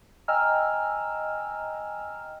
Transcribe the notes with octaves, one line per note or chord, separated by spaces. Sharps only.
D#5 G5 G#5 A#5 E6 F6